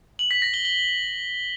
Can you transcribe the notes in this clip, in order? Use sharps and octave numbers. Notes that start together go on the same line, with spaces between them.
F#7
B6
A#6
G7
G7